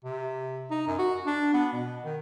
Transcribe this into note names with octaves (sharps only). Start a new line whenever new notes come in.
C3
D#4
F#2
F#4
D4
B3
B2
D#3